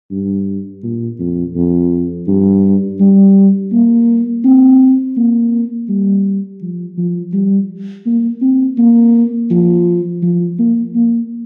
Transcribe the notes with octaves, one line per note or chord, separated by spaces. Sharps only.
G2
A#2
F2
F2
G2
G3
A#3
C4
A#3
G3
F3
F3
G3
A#3
C4
A#3
F3
F3
A#3
A#3